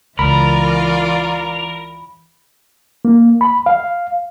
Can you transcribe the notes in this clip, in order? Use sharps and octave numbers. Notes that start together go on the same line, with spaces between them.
C#2 E3 F4 A#4 D5 B5
A#3
B5
F5